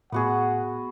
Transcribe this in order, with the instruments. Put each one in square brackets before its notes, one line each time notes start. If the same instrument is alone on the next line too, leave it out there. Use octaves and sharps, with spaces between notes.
[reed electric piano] A2 [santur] B3 F#4 G#4 [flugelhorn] F#5